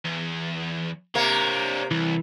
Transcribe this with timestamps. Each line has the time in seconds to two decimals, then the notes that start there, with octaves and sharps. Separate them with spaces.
0.05 E2
1.15 C3 A#3 D4 C#5
1.91 C2 E3